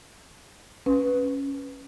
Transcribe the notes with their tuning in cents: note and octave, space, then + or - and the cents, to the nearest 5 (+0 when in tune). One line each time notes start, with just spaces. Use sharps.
C#4 +0 B4 +0